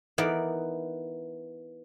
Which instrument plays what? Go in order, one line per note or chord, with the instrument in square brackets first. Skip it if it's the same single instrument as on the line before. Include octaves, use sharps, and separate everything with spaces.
[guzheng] E3 B3 D#4 A#4 D5